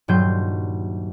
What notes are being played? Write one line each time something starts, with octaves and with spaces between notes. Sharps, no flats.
D#1 G2 F#3 C6 G6